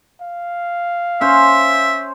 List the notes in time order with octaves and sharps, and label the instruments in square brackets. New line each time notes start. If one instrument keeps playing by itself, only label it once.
[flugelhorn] F5
[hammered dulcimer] C#4 C5 [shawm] E5